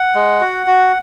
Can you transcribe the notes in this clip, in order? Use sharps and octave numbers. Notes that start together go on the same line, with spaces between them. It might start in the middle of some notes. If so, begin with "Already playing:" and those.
Already playing: F#5
G#3
F#4
F#4